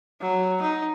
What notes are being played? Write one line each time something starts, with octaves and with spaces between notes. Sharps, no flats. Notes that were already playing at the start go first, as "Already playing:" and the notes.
F#3
D#4